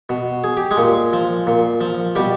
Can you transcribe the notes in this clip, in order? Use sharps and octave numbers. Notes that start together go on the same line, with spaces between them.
B2
G#4
G4
G#3 G#4
A#2
F3
A#2
F3
B2 G3 G4